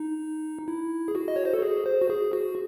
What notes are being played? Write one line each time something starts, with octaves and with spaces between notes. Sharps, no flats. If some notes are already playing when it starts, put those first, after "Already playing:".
Already playing: D#4
E4
G#4
F#4
D#5
C#5
C5
A4
G#4
C5
F#4
G#4
F#4